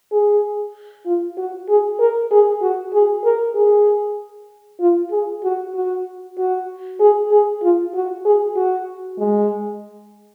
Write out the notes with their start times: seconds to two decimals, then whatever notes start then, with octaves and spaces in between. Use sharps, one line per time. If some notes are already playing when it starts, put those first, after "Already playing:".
0.12 G#4
1.06 F4
1.37 F#4
1.68 G#4
1.99 A#4
2.31 G#4
2.62 F#4
2.93 G#4
3.25 A#4
3.55 G#4
4.80 F4
5.11 G#4
5.44 F#4
5.74 F#4
6.38 F#4
7.00 G#4
7.31 G#4
7.63 F4
7.94 F#4
8.25 G#4
8.56 F#4
9.18 G#3